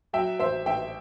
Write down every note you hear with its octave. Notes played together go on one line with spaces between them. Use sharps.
F#3 E5 G5
A1 C5 E5
A1 E5 G5